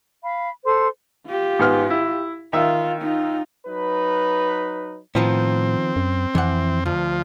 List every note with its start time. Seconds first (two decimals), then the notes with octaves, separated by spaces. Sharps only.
0.24 F5 B5
0.65 A4 C5 C6
1.27 F4 G4
1.59 G#2 B3 F6
1.90 E4
2.53 D#3 F4 E5
3.01 D#4 F4
3.67 F#3 D#4 B4
5.15 A2 D#3 F3 B3 C4
5.96 F#2
6.35 F2 E3 F#5
6.86 D2 F3